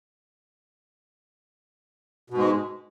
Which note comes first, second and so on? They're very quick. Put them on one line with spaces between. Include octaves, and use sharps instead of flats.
B2 G#2 G#3